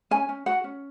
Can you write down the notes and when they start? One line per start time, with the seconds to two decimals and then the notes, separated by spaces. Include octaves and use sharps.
0.11 C#4 G#5
0.29 C#4
0.46 F#4 F#5
0.64 C#4